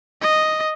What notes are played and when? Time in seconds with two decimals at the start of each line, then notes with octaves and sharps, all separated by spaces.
0.22 D#5